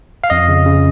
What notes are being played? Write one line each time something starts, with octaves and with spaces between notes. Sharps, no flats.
F5
F2 D#5
C#3
C#3